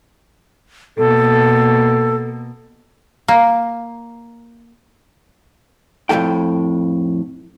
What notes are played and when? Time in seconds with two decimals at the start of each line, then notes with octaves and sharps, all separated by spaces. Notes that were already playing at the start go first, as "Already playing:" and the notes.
0.97 B2 A#3 A4
3.28 A#3
6.09 F2 A2 E3 A4 G5